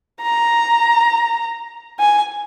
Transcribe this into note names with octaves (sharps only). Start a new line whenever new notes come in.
A#5
G#5